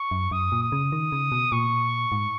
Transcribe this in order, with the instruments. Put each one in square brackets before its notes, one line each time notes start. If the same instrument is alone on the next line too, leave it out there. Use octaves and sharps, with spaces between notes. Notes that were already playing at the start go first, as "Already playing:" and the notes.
Already playing: [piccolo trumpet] C#6
[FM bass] F#2
[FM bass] F#2 [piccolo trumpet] D#6
[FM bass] A#2
[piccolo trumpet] D#6
[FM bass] C#3
D#3
C#3
B2
[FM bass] A#2 [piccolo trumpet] C#6
[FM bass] G#2